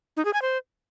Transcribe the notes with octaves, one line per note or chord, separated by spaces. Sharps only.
D#4
G#4
G#5
C5